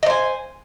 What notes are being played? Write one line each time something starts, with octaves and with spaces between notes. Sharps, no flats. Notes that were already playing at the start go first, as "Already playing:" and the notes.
C5 D#5 G#5